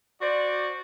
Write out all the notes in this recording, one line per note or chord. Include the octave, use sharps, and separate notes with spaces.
F#4 C5 D5